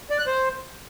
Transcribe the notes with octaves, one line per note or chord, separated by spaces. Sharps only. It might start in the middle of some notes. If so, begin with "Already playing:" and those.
D5
F#6
C5